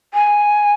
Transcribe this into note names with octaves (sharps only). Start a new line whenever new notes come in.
G#5